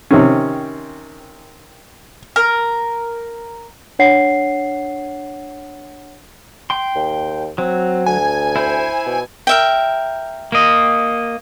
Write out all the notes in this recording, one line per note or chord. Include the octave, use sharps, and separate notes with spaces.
C3 D#3 C4 C#4
A#4
D4 C#5 F#5 C7
G5 C6
D#2
F#3 C4
D2 G#5
E4 C5
B2
A#4 E5 G5
A#3 D#5